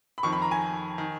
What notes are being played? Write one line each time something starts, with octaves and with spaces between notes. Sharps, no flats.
B5
F2 D#3 C#6
B5
A#5
G#5
D#3